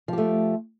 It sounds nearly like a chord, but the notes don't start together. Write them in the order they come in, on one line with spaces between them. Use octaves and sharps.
F3 G4 A3